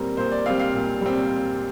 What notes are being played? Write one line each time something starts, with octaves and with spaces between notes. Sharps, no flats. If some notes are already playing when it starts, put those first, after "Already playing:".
Already playing: A#2 G3 C4 A#4
A#2 C5
D5
G3 C4 F5
F5
A#2
G3 C4